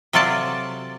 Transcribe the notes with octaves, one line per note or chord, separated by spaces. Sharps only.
C3 F#3 F4 A4 D5 A5